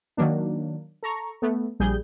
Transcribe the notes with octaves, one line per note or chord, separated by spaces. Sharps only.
D#3 F#3 A#3 D4
A4 A#5 C#6
A3 B3
A#1 G3 G#4 G6